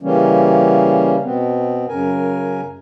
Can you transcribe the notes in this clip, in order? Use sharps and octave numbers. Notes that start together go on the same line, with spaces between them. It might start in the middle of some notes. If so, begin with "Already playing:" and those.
C#3 E3 G3 A#3 C#4
B2 B3 C4
F#2 C#3 A#4 G#5